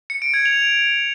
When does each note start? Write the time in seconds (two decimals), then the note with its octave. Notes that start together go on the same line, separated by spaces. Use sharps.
0.10 C#7
0.22 D7
0.34 G#6
0.45 F7